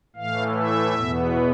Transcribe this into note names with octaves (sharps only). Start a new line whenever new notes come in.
A2 E3 A3 F5
E5
E2 B2 B3